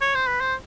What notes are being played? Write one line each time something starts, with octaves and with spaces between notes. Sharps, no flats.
C#5
C5
B4
C5